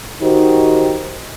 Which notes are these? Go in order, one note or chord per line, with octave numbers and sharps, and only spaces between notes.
D#3 D#4 F#4 G4 C5